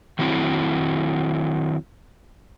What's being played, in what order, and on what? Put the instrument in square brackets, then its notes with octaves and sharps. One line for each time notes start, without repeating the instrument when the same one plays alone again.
[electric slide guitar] D#3 F#3 C4 E4